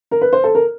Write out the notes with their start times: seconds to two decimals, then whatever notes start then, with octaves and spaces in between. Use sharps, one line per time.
0.11 A#4
0.21 B4
0.33 C5
0.44 A4
0.55 A#4